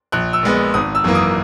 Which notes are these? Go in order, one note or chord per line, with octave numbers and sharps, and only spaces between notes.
A#1 F#6
E6
A#2 G#3 B3
G#1 D#6
E6
F#2 E3 A#3
D#6